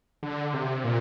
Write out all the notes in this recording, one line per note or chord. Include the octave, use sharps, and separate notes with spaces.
D3
C3
A#2